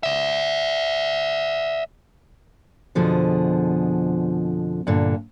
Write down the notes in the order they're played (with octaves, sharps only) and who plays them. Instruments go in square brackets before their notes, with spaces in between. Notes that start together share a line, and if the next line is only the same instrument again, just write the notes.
[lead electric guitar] D5 E5
[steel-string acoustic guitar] F2 B2 D3 F3 G#4
G2 A#2 D3